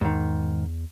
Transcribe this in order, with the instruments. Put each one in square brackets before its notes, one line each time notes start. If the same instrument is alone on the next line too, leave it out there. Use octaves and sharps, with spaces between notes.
[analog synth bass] E2 [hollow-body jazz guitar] G#2 D#3